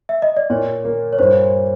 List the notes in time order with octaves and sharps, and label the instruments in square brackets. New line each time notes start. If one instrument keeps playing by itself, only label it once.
[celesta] E5
D#5
D5
[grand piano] A#2 [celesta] C#5
[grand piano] A#3
[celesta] C#5
[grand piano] G2 [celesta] C5